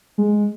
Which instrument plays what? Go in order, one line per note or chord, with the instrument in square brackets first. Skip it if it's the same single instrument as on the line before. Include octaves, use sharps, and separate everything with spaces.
[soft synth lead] G#3